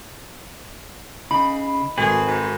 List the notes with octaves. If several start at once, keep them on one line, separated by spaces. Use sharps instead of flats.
C#3 D#4 B5
G#1 C4 F#4 G#4 A4 B4 B6
G#2